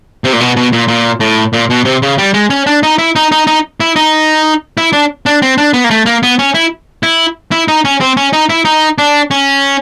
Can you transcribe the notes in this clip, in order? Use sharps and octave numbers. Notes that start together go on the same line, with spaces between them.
C3
A#2
B2
B2
A#2
A#2
A2
A#2
B2
C3
C#3
G3
G#3
C#4
D4
D#4
E4
D#4
D#4
D#4
E4
D#4
E4
D4
D4
C4
D4
B3
A#3
A3
A#3
B3
C#4
E4
E4
E4
D#4
C#4
C4
C#4
D#4
E4
D#4
D4
C#4